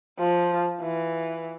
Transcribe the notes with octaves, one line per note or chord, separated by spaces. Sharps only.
F3
E3